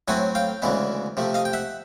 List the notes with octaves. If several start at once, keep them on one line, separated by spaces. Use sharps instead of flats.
A2 F#3 A3 C4 F#5 G#5
F5 G5
D2 C#3 E3 G#3 B3
C3 F3 A3
D#5 F5
G5
E5 F#5